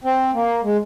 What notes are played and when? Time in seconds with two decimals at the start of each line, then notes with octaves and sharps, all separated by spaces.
0.04 C4
0.34 A#3
0.64 G#3